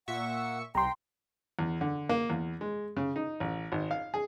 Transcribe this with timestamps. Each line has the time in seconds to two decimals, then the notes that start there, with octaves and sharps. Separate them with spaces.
0.08 A#2 E5 F#5 C#6
0.75 C2 G5 A#5 C6
1.59 E2
1.81 D3
2.09 A#3
2.30 E2
2.61 G#3
2.97 C#3
3.16 D#4
3.40 A1
3.72 G#1
3.91 F5
4.14 G#4